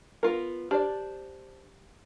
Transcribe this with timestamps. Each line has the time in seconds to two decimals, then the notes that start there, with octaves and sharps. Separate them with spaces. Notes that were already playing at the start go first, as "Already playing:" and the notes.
0.23 B3 F4 A#4
0.71 D4 G4 C5 D5